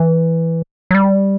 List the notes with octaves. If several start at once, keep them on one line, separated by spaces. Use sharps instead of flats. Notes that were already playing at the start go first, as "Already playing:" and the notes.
Already playing: E3
F#3
G3